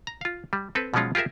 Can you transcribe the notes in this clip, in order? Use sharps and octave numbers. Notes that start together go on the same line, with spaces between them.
A#5
F4 F5
G3
C4 A4 B4
B2 F3 F#3 G#3 C#4 F4
F4 G4 G#4 A#4 E5